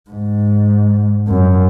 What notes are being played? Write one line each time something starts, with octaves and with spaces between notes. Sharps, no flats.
G#2
F#2